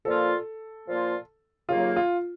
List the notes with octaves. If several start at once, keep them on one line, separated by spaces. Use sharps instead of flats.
A#2 F3 A#3 F4 A4
A#2 F3 A#3 F4
D#2 C#3 F#3 A#3 F4
F4